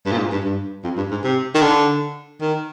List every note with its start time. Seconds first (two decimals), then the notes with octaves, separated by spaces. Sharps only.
0.06 G2
0.12 A#2
0.18 G#2
0.32 G2
0.44 G2
0.84 F2
0.97 G2
1.11 G#2
1.24 C3
1.55 D#3
1.62 D3
2.41 D#3